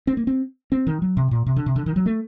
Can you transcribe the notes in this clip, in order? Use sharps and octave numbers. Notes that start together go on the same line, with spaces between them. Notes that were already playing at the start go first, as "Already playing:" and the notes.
C4
A#3
C4
C4
D#3
F#3
C3
A#2
C3
D3
C3
D3
D#3
F#3
A3